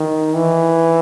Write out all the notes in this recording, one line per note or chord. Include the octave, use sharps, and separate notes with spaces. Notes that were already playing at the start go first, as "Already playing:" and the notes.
Already playing: D#3
E3